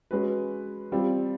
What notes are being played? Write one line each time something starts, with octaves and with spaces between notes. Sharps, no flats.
G#3 C#4 F#4 B4
G3 C4 F4